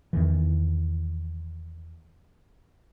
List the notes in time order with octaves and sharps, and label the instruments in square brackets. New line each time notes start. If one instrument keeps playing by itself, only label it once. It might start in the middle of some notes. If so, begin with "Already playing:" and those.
[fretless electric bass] E2 D#3 E3